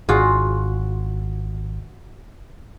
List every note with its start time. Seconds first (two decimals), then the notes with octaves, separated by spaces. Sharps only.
0.09 G#1 F4 F#4 G#4